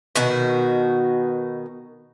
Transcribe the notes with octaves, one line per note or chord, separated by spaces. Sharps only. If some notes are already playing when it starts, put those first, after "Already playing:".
B2 D#3 F#4